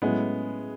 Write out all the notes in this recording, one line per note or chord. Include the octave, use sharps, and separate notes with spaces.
A2 F#3 G#3 B3 C#4 E4